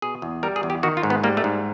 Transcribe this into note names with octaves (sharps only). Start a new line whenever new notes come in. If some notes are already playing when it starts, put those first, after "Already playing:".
B2 G#4
E2
G3 A#4
G#4
E2
G4
D#3 F#4
F4
G#2
B3
G3 A#3
A3
G#2